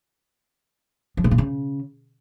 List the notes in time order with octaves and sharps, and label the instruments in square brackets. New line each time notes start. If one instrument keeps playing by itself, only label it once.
[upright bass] F3
A2
A#2
C#3